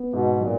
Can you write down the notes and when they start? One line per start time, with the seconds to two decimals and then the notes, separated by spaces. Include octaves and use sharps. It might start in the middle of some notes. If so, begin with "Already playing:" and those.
Already playing: B3
0.13 G#2 B2
0.41 A#2 F#3